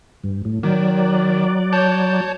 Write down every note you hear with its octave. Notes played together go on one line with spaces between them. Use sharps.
G2
A2
D#3 F#3 D5
C#5 A5 G6